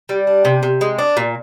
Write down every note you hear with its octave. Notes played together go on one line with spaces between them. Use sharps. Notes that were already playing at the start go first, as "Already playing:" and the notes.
G3
D4
C3
C3
G#3
D4
A#2